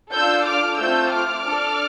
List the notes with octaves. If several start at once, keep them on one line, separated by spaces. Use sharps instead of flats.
D4 F4 A4 E6 G6
D6 F6
A3 C4 F4 E6 G6
D6 F6
D4 A4